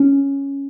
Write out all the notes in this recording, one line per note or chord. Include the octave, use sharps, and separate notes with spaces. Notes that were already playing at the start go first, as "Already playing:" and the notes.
Already playing: C#4